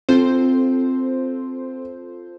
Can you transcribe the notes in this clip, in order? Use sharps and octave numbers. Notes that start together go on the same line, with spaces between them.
C4 F4 A4 C5